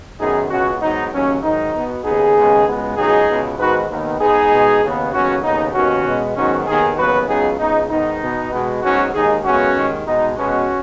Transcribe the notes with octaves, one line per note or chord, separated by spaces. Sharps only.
F#2 D#3 B3 D#4 G#4
C#2 B2 B3 C#4 F#4
G#2 F#3 B3 D#4
D#2 C#3 F#3 C#4
G#2 D#3 F#3 D#4
B2 B3
D#2 C#3 B3 D#4 G#4
D#2 C#3 G#3 B3
C#2 B2 G#3 B3
C#2 B2 F#3 D#4 G#4
C#2 B2 B3
G#2 D#3 B3 F#4 B4
D#2 D#3 B3
G#2 G#3 B3 D#4 G#4
B2 G#3 B3
D#2 C#3 B3
D#2 C#3 F#3 B3 C#4 F#4
D#2 C#3 B3 D#4
D#2 D#3 B3 C#4 F#4
B2 G#3 B3
G#2 D#3 F#3 B3 C#4 F#4
D#2 D#3 B3 D#4 G#4
D#2 C#3 F#3 B3 F#4 B4
C#2 C#3 F#3 B3 D#4 G#4
C#2 C#3 G#3 B3 D#4
G#2 D#3 B3 D#4
B2 B3
B2 G#3 B3
G#2 F#3 B3 C#4 F#4
D#2 D#3 G#3 D#4 G#4
F#2 C#3 G#3 B3 C#4 F#4
D#2 D#3 G#3
B2 G#3 B3 D#4
B2 G#3 B3 C#4 F#4